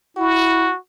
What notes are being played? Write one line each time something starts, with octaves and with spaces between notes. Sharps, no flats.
E4 F#4